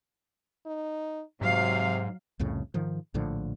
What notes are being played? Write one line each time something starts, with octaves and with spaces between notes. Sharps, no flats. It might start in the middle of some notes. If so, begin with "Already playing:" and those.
D#4
G#2 C3 F#3 F5
C2 F2 A2 C#3
G#2 D#3 F3
A#1 A2 D3 F3